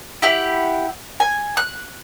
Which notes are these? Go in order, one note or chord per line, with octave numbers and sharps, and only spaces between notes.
E4 G4 F#5
G#5
F#6